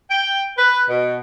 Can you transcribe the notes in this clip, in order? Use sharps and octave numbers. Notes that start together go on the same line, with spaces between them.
G5
B4
B2